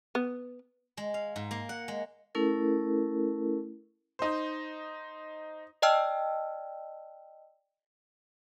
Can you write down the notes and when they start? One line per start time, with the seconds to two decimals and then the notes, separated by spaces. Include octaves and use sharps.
0.15 B3
0.97 G#3
1.14 F5
1.36 G#2
1.51 A#3
1.69 F#5
1.88 G#3
2.35 A3 C#4 E4 A4 A#4
4.19 D#4 C5
5.82 D5 D#5 G5 A5 E6 F6